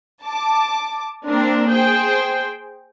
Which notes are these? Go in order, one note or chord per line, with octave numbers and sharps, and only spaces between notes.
A5 D6
A#3 C4 D4 A#4
G#4 C5 G5